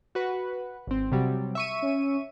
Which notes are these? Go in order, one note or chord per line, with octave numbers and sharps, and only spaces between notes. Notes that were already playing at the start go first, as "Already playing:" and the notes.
F#4 B4
G#1 C4
C3 F#3 G3
E5 C#6 D#7
C#4